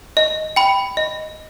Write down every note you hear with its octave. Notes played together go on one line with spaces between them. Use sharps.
D#5
G5 B5
D#5